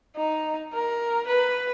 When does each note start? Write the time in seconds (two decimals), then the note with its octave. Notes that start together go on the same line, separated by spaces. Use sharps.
0.16 D#4
0.73 A#4
1.27 B4